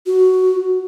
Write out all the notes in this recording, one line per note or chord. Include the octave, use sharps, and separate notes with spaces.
F#4